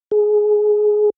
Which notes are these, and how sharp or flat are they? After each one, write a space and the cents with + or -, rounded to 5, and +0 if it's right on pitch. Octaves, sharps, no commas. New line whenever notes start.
G#4 +15